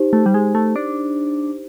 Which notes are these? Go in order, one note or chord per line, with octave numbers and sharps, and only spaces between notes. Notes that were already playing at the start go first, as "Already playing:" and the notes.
Already playing: D#4 G4 C5
A3
G3
G#3
A3
D4